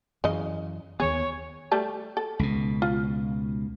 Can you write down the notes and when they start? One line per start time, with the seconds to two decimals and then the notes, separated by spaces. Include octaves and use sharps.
0.24 F#2 C#3 E3 D#5
1.00 D#2 D#3 B3 G#4 C#5
1.71 G3 A3 A5
2.17 A4
2.39 C#2 B2
2.82 F4